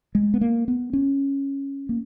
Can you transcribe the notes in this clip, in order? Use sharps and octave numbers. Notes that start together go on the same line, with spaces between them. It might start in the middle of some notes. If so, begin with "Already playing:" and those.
G#3
B3
A#3
B3
C#4
A#3